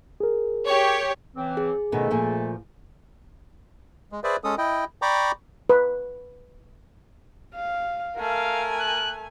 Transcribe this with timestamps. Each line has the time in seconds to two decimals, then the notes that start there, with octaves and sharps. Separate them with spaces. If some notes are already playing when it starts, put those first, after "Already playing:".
0.20 G#4 A#4
0.68 G4 C#5
1.36 C#3 E3 C4
1.57 G#4
1.92 F2 B2 D#3 A3 C#4 A4
2.11 A#2 F3 G#5
4.12 G#3
4.24 G#4 B4 C5 D5 E5
4.44 G#3 C#4 A4 D#6
4.58 E4 D#5 G5
5.02 D5 G5 A#5 B5 C#6 D6
5.69 B4
7.55 F5
8.18 A3 A#4 F5 G#5
8.80 F#6